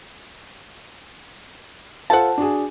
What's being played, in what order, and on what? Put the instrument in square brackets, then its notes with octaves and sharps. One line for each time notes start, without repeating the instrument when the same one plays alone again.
[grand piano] F4 A4 C5 [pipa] F#5 A5
[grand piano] D4 F#4 G#4